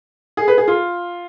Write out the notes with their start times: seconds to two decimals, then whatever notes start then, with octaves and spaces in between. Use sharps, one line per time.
0.37 G#4
0.48 B4
0.58 G#4
0.68 F4